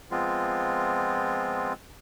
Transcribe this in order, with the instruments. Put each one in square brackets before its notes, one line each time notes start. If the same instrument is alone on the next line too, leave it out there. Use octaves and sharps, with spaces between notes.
[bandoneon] F3 G#3 B3 C4 F4